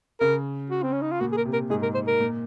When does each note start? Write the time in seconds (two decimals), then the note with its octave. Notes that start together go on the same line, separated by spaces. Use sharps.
0.20 C#3 A#4
0.70 F#4
0.83 C4
0.92 C#4
1.02 D#4
1.11 F4
1.20 A#2 F#4
1.32 G#4
1.37 A#4
1.45 C3
1.53 A#4
1.70 G#2 G#4
1.83 A#4
1.94 C5
2.07 A#4
2.20 A#2